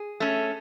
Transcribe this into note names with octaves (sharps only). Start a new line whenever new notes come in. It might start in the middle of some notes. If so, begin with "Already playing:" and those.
Already playing: G#4
A3 C#4